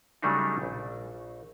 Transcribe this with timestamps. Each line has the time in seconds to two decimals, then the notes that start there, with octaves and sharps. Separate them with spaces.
0.22 C#3 F#3 G3 A3 D4 D#4
0.62 A#1